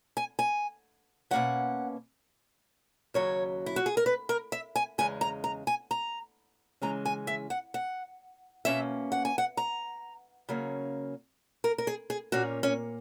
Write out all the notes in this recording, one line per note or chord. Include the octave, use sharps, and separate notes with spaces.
G#5
G#5
B2 A#3 C#4 F#5
D#2 C#3 F#3 C#5
E4
F#4
G#4
A#4
B4
A#4
E5
G#5
E2 C#3 G#3 G#5
A#5
A#5
G#5
A#5
C#3 E3 G#3 C#4 A#5
G#5
E5
F#5
F#5
B2 A#3 C#4 E5
F#5
G#5
F#5
A#5
C#3 F#3 A#3 C#4
A#4
A#4
G#4
G#4
A#2 A#3 C#4 F#4
C#4